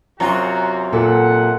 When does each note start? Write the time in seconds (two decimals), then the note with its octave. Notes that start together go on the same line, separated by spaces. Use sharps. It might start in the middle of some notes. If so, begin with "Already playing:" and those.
0.20 F#2 C3 F4 F#4 A#5
0.93 A#2 A4 F#5